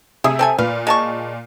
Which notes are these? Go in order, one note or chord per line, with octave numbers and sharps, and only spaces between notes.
C3 G#4 E5 D#6
C4 A4 G#5
A#2 B4 F5
G#3 A5 C#6